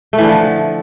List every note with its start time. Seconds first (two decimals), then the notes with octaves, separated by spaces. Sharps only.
0.13 A3
0.18 E3
0.23 D3
0.28 F3